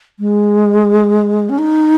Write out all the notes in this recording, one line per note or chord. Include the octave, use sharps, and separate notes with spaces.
G#3
C#4
D#4